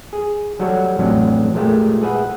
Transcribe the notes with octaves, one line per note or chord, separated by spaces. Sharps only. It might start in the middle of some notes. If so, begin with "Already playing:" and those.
G#4
F#3 G3 F#4 A4 C#5
A1 F2 F#3 D4
A#2 G#3 A3 G4
G#4 B4 E5 F#5